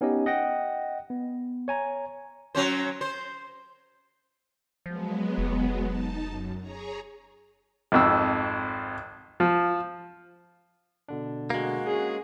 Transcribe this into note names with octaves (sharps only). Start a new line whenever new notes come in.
B3 C#4 D#4 G4 D#5
D#5 F#5 G5 A#6
B3
C#5 G#5 A#5
F#3 C#4 C5
C5
F3 F#3 G#3 B3
F1
D#4 A5
F#2
G#4 C#5 A#5
G#1 F2 E6
F3
B2 D3 D4
G#3 A#3 F#4
C#4 G#4